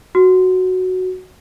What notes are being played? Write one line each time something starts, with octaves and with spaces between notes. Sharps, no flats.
F#4